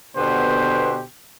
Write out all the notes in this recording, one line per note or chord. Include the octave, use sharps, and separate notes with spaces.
B2 D3 B3 G4 C5